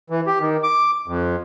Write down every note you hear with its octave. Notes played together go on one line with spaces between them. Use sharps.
E3
G4
D#3
D6
F2